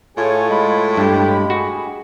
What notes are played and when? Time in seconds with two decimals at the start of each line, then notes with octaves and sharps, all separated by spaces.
0.17 A2 F4 G#4 C#5 G#5
0.50 G#3 F4 B5
0.97 G2 G4
1.50 F#4 G#4